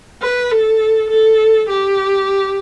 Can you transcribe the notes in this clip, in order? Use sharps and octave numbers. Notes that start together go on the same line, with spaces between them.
B4
A4
A4
G4